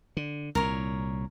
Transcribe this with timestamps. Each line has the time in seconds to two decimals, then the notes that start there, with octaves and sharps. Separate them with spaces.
0.17 D3
0.55 C2 A#2 A#4 C#5